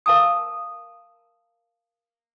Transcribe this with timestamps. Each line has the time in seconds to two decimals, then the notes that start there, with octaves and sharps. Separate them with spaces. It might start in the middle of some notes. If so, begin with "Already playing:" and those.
0.06 A#4 F5 A5 A#5 D#6